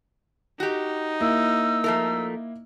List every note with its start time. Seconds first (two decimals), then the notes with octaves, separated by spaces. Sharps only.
0.60 D#4 F#4 G4
1.20 A#3 E4 E6
1.84 F3 A3 A#4